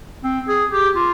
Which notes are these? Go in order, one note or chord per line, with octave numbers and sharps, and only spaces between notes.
C4
G#4
G4
F4